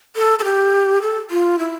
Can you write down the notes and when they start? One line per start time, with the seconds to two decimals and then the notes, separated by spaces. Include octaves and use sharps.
0.16 A4
0.39 A4
0.44 G4
1.02 A4
1.31 F4
1.59 E4